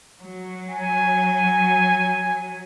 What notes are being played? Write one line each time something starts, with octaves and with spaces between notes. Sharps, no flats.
F#3
G#5